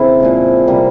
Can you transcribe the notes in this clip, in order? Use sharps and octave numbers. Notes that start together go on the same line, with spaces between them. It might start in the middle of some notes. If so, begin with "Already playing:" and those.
Already playing: C#3 E3 A#3 C4 E4
A#2 F3 G#3
C3 G3 A#3